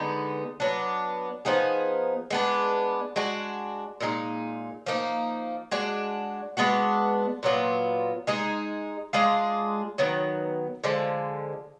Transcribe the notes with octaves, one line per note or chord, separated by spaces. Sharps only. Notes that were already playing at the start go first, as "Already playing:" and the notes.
Already playing: D3 G#3 B3 D#4
F#3 B3 D4
F3 B3 D#4 G#4
G#3 B3 D4
G#3 D4 F#4
A#2 G#3 D#4
F3 A#3 D#4
G#3 D4 F#4
G#3 B3 D4 F#4
A#2 F#3 B3 F4
G#3 D#4 G#4
G#3 D4 F4 G#4
D#3 F#3 B3
D3 F3 G#3